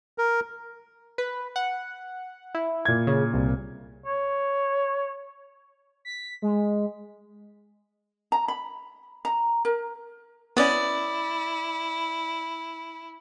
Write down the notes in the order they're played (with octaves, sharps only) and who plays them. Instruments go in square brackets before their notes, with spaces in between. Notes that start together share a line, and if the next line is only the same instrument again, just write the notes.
[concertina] A#4
[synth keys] B4
F#5
E4
[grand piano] A#2 G#6
[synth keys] C#3
C2
[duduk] C#5
[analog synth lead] B6
G#3
[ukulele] A#5
B5
A#5
A#4
[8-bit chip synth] B3 C#4 [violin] E4 [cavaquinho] D5 D#6